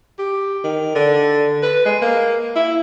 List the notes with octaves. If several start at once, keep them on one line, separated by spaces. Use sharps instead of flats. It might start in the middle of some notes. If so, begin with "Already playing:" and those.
G4
D#3
D3
B4
G#3
A#3
E4